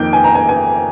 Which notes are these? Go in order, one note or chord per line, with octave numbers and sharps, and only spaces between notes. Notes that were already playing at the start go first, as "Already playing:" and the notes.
Already playing: F2 D#3 A#3 G5
G#5
A#5
G#5
G#5